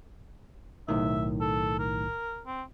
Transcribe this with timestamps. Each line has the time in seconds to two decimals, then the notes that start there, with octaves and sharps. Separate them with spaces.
0.88 B1 A2 D#3 E5
1.41 A4
1.79 A#4
2.47 C4